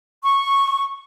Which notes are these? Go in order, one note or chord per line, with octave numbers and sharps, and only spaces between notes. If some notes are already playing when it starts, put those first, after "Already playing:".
C#6